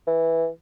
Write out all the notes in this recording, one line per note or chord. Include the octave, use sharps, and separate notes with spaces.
E3